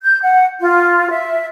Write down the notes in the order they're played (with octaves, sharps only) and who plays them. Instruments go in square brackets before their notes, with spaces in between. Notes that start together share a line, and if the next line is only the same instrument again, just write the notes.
[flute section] G6
F#5
F4
E5